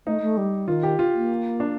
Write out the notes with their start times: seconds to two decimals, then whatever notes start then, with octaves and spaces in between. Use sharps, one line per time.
0.07 A3 D#4
0.22 A3
0.37 G3
0.68 D#3 F4
0.83 G4
0.99 F4
1.14 A#3
1.60 D4